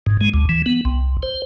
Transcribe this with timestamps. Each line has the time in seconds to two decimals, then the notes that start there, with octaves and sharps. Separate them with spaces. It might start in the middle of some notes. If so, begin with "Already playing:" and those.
0.06 G#2
0.21 G#3
0.34 D2
0.49 E3
0.66 B3
0.85 C2
1.23 C5